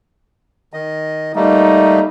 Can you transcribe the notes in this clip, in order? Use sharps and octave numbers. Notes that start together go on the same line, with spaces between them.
D#3 D#5
G3 A3 A#3 D#4